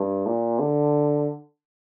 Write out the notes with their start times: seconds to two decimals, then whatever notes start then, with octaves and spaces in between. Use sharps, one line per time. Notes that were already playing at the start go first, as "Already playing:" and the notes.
Already playing: G2
0.26 A#2
0.60 D3